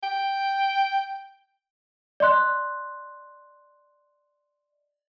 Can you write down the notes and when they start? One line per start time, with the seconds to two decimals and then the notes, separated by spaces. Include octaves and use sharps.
0.03 G5
2.20 D5 D#5 C6 F#6